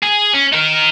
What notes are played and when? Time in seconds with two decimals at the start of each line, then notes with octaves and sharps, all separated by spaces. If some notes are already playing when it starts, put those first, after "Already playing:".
0.03 G#4
0.34 C#4
0.52 D#4 A#4